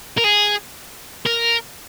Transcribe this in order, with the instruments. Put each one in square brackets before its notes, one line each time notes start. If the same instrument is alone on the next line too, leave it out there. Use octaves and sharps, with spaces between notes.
[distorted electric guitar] A#4
G#4
A#4